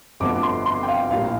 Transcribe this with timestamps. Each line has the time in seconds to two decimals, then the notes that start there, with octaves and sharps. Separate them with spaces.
0.20 G1 F2 D3 F3 A3 D6
0.43 C6
0.66 C6
0.83 G5
0.88 F5
1.10 A#1 A2 G3 A#3 F5